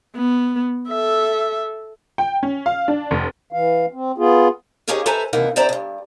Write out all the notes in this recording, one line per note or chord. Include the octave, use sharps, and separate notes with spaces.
B3
A4 E5
G5
C#4
F5
D4
F1
E3 F5
C4
B3 F4 G#4
A#3 C#4 D#4 G4 G#4 C#5
A4 B4 C5 E5 G#5 A#5
D#2 C3 E3 A#3 D#4 F#5
G2 C4 C5 D5 E5 A#5
G2 B2